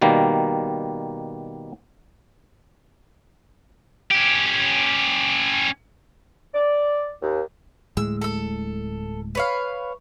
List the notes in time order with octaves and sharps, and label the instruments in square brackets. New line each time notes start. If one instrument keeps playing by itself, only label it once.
[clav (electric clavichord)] B2 D#3 G3 A#3
[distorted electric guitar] C#4 G4
[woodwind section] D5
D#2
[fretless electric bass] D1 A2 G#3 [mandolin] E6
[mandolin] A4 E6
B4 C#5 F5